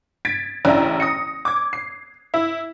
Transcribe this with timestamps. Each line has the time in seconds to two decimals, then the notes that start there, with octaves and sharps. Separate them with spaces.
0.25 G#6 A6 B6 D7
0.65 A1 C#3 D4 E4 A#5
1.00 D#6 A#6 C#7
1.45 D6 G#6
1.73 C7
2.34 E4